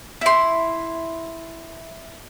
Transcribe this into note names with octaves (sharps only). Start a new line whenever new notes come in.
E4 C6